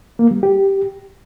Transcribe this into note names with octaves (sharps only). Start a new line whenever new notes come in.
A#3
G3
G4